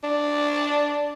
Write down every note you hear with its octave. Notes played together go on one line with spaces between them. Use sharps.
D4